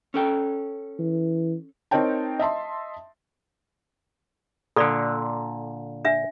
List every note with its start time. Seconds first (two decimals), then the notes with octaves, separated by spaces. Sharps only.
0.14 C#4 A4 G5
0.99 E3
1.91 C4 D#4 A#4 C#5 G5 A5
2.39 D#5 E5 A5 C6
4.76 A#2 D3 A4 D5
6.05 D4 E5